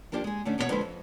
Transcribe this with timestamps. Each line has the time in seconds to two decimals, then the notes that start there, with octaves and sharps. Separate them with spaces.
0.12 F3 A#3 D4 G4
0.24 G#3 G#4
0.45 D3 A3 C#4 D4
0.58 E2 B2 A#3 E4 C#5 F#5
0.69 D#2 D3 F3 G#3 B4 C5
0.81 F2